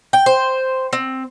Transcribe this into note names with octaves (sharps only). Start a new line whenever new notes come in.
G5
C5
C4